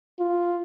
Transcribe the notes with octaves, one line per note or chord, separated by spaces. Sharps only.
F4